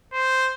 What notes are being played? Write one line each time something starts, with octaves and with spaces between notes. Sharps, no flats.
C5